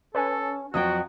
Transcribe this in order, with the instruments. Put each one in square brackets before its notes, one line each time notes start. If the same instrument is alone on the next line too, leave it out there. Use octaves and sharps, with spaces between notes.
[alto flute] C#4 [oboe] A4 [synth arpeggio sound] B4 C#5 G#5
[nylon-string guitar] F2 F#3 G5 [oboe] F#4 [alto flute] C5 [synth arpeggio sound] D#6